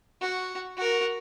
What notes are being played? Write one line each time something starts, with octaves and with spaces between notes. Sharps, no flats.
F#4
F#4 A#4